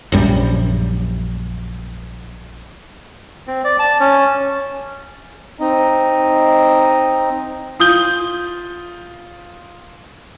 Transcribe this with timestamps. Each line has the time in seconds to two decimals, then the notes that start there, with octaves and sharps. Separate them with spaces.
0.12 A#1 F#2 G3
3.47 C4
3.64 D5
3.79 A5
4.00 C#4
5.60 C4 D#4 D#5
7.80 F4 D#6 G6 G7